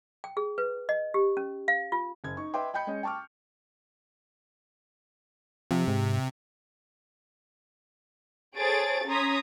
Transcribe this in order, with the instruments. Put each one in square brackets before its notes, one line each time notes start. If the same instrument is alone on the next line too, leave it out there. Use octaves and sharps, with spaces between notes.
[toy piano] G5
G#4
B4
D#5
G4
C#4
F5
F4
[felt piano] F#1 G#6
D#4 C#6
B4 D#5 E5 G5 C6 D6
D#5 G5 B5 G6 C#7
G#3 C#4 D#5
G5 A5 C#6 D6 F6
[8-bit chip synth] C3 [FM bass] F3
[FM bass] G#2
[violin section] G#4 A4 C5 C#5 A6 D7
C#4 A#5 C6 D#6 G#6 B6